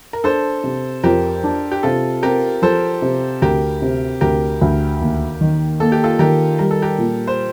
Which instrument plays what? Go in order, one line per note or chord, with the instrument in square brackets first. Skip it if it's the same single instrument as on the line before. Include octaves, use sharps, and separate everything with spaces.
[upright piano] A#4
[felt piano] D4 [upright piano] A4 C5
[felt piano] C3
[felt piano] F2 [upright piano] G4 A#4
[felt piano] D4
[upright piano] G4
[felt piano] C3 [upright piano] F4 A4
[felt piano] C4 [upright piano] G4 A#4
[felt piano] F3 [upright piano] A4 C5
[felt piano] C3
[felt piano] D2 [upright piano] G4 A#4
[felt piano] C3
[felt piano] D2 [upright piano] G4 A#4
[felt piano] D2
D#2
D#3
[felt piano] A#3 [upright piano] A4
[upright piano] G4
F4 A4
[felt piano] D#3 [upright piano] G4 A#4
[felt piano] G3 [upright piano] A#4
[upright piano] A4
G4 A#4
[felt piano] A#2
[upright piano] C5